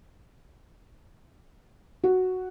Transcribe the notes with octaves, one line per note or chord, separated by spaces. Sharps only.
F#4